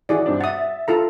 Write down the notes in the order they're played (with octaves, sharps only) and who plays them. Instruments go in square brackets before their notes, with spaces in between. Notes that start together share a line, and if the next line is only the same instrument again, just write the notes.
[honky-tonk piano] E3 [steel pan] F#4 G#4 D5
[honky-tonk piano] G2 C4 D4
[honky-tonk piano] E5 A6 [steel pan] F#5 D#6
[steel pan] F4 A4 A#5